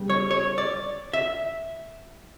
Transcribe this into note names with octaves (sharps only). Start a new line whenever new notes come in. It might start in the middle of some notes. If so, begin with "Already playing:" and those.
Already playing: C#3 G3 B3
C#5
C#5
D5
E5